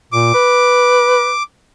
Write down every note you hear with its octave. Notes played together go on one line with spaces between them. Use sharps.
A#2 D6
B4